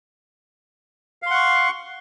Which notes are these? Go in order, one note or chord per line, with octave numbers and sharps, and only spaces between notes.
F5 F#5 C6 C#6